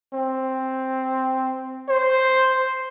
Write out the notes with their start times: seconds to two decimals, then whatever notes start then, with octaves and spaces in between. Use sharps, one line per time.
0.14 C4
1.89 C5